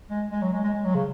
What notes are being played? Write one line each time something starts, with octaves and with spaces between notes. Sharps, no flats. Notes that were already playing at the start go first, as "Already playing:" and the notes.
G#3
G#3
F#3
G#3
G#3
G#3
F#3
C#3